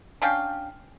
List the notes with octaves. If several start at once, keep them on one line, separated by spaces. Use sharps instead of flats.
C#4 D4 F5 G5